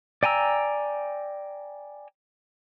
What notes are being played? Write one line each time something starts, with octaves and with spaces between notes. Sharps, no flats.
D5 G5 G#5 A#5 E6